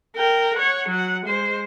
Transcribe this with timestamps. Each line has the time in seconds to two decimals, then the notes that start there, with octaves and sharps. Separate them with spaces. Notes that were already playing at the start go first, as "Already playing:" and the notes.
0.16 A#4 G5
0.56 C#5 F#5
0.89 F#3 F#5
1.26 G#3 C5